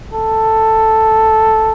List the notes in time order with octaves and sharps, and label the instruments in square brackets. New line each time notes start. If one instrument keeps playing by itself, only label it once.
[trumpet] A4